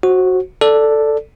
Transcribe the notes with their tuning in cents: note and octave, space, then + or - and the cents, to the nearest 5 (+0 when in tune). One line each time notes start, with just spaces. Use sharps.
F#4 +0 C5 +30
A4 +5 D5 +0